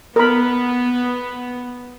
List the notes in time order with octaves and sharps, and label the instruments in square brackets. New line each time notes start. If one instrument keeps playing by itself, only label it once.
[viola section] B3 [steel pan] A#4 B5